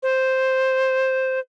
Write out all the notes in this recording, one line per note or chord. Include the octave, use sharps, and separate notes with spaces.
C5